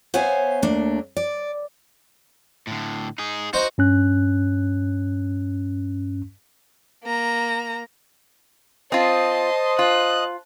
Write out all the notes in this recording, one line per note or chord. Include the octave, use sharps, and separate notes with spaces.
B3 C5 C#5 E5 F5 G#5
D#2 A3 A#3 D4
D5
A2 D3
D#4 G#4
D#4 F#4 C5
G2 C#4 F#6
A#3 A#5
C4 F4 C5 D#5 A5 C6 D#6
F4 A5 F#6